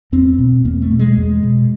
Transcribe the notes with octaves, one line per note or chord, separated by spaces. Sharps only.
E2 C4
B2
E2 A#3
A3
B2
G#3
E2
B2